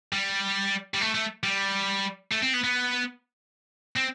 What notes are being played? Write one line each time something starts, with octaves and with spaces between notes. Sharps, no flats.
G3
G3
A3
A3
G3
A3
C4
B3
B3
C4